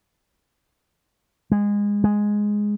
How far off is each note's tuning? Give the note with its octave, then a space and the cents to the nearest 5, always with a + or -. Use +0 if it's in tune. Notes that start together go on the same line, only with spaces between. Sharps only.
G#3 -20
G#3 +0